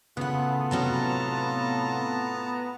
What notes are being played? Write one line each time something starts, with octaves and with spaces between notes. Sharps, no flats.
A2 C#3 B3 F4 A4 F#5
C3 F#3 C#4 A5 A#5